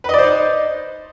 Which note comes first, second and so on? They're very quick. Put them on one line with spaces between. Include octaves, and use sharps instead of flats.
B4 D#5 D5 C5 D#4